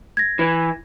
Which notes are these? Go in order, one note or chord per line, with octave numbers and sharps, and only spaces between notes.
G#6 A#6
E3